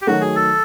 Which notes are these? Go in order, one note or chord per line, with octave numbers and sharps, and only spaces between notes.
G4
D#3 F#3 A3 F#4
G#4
A4